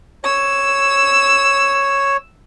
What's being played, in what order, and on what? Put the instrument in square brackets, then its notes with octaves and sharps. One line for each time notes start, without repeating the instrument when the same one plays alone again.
[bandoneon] C#5 [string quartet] E6